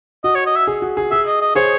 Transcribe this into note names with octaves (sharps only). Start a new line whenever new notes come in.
F#4 D#5
C#5
D#5
E5
G#4
F#4
G#4
G#4 E5
D#5
D#5
G#4 C5 C#5